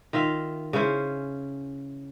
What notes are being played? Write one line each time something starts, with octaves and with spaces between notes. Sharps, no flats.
D#3 F4 E5 F5
C#3 C#4 E4 C5